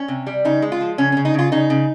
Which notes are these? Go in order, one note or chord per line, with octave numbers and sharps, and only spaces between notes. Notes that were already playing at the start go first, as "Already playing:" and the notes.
Already playing: C#4
C3
G3
C#3 D#4
G#3
F4
F3
C#3 C#4
C#4
C#3
D#4
C#3 F4
C#3 D#4
C#3